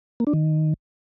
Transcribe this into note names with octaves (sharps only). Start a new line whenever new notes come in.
A#3
D4
D#3